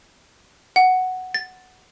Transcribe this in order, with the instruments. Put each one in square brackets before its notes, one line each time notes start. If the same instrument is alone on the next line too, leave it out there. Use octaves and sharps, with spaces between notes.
[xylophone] F#5
A6